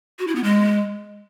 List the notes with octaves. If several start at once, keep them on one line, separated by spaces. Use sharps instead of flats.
F#4
E4
B3
G#3